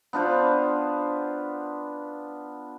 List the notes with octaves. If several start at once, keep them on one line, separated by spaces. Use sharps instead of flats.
B3 D4 F4 C5